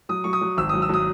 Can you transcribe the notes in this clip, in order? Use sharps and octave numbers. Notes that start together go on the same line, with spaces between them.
F#3 D#6
F#3 C#6
D#6
F#3
G#1 E6
F#3 D#6
E6
F#3 D#6